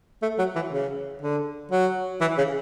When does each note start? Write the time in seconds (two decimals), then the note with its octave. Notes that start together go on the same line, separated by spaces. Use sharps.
0.22 A3
0.39 F#3
0.55 E3
0.72 C#3
1.22 D3
1.71 F#3
2.21 E3
2.38 C#3